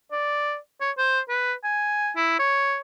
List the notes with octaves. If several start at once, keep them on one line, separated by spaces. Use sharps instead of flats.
D5
C#5
C5
B4
G#5
E4
C#5